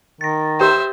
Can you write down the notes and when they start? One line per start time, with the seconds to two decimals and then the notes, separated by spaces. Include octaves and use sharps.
0.21 D#3 A6 A#6
0.60 G4 C5 E5 G5